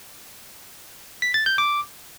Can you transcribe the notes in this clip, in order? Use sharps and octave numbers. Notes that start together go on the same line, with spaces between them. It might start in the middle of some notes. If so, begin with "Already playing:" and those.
B6
A6
G6
D6